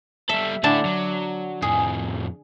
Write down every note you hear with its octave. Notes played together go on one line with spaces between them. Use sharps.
G3 A4 E5
D3 A3 D4 E4 A5
F#3
F2 A2 G#4